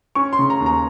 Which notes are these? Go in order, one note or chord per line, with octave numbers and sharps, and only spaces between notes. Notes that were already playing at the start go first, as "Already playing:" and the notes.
C#4 C#6
C6
C#3
A#5
D#2
A#5